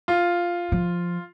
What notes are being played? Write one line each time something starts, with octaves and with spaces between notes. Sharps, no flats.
F4
F3